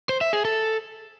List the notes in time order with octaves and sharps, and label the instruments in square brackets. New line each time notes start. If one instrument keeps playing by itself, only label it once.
[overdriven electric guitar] C5
E5
G#4
A4